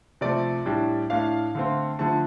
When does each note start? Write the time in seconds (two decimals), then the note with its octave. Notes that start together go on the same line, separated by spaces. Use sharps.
0.21 C3 F3 A3 D5
0.66 A2 G3 D4
1.10 A2 A3 D4 F5
1.55 D3 A3 C4
1.99 D3 F3 A3 A5